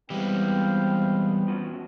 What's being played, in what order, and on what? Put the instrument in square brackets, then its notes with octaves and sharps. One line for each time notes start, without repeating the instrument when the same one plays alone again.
[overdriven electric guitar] E3 G#3 [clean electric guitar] G3 [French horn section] B3 C4 [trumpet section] F5 G5
[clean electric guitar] F3 C#4 F#4